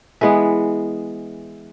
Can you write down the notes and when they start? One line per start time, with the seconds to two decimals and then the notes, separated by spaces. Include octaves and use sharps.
0.21 E3 G#3 B3 B4